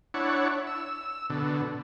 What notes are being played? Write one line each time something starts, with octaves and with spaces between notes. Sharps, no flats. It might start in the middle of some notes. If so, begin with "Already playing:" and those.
D4 E4 C#5 F#5
E6
B2 D3